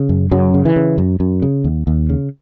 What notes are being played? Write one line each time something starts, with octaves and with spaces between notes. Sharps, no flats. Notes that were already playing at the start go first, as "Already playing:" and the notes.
Already playing: C#3
F#2
F#2 C#3 F#3
C#3
E3
C#3
F#2
F#2
C#3
D#2
D#2
C#3